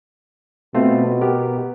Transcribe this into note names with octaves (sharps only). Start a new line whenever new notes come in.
B2 A3 C4 F4
B3 G4 A#4